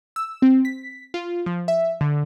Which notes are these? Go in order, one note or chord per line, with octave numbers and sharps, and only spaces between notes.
E6
C4
B6
F4
F3
E5
D3